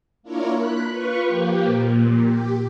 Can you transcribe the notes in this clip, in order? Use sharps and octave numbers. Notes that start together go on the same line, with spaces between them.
A#3 D4 E4 F4 A#4 C#5
B5 F#6
F4 B4 C#6
F3 A#3 G4
A#2
G4